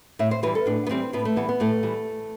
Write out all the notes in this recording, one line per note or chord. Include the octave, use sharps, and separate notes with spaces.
A2 E5
C5
E3 G3 B4
A4
A2 D4
B3
E3 G3 C4
A2 B3
A3
E3 G3 B3
B3
A2 A3
E3 G3